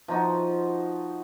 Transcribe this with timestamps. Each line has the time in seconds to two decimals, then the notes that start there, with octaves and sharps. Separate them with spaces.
0.08 F3 D#4 F#4